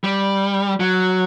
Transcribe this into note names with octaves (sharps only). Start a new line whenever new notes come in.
G3
F#3